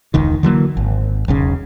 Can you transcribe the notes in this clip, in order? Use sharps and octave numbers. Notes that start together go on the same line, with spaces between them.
E1 C#2 D#3
D3 E3 F#3 A#3
G#1
E1 B1 C#3